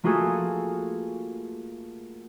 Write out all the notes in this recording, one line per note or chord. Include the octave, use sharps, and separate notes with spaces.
A3 A#3 F4 F#4 G#4 A4